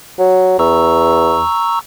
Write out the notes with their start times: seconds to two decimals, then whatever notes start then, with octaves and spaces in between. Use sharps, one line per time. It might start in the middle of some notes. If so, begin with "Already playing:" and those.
0.19 F#3
0.59 E2 A#5 C#6 E6